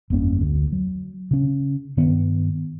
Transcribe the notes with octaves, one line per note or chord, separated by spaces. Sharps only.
G1 F2 A#3 C#4
D2
F#3
C#3 C#4
G2 D#3 B3